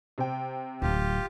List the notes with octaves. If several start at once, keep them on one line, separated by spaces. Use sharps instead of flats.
C3 C5 G5
D1 F#3 F4 G4